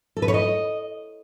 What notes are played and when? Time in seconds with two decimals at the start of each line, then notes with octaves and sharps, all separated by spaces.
0.17 A4
0.22 B4
0.28 C#5
0.34 D#5